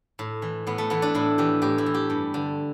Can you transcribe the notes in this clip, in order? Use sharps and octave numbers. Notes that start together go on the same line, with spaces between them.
A2
E3
A2 B3
A3
E3 B3
D4
A2 E4
E3 G4
A2 G4
E4
E3
G4
G2
D3